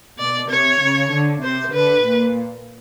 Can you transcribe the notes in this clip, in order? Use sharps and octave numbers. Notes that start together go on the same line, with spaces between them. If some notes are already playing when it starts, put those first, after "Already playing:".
B2 D5
C3 C#5
C#3
D3
C3 C5
D3 B4
A#2